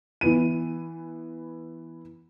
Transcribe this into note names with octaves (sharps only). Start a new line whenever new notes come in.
E3 B3 D#7